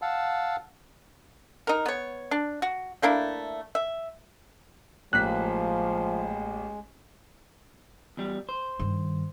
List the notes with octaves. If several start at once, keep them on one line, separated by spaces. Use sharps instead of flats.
F5 F#5 A5 E6
D#4 A#4
B3 C#5
D4
F#4
A3 A#3 D4 E4
E5
A1 F3 G#3 A#3 F#6 B6
E2 G3
C5
G2 D#3